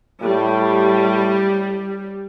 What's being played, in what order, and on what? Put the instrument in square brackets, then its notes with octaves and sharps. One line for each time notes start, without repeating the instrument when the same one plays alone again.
[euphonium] A2 [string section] G3